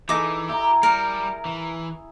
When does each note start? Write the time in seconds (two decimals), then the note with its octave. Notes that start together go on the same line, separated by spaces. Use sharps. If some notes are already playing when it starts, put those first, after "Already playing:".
0.09 E3 D#4 G#4 A4 D6
0.49 E4 G4 A#5
0.83 G3 A#4
1.45 E3